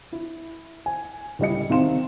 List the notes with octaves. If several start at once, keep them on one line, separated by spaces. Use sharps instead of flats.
E4
G#5
C#2 A2 G3 E4 D#5 C#7
C3 D#3 C4 F5 C6 E7